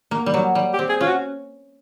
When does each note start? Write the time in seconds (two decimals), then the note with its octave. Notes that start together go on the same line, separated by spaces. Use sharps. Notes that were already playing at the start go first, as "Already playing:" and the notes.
0.11 A#3
0.26 G3
0.34 F#3
0.55 G3
0.73 G4
0.79 C4
0.89 G#4
1.01 C#4 F4
1.07 F#4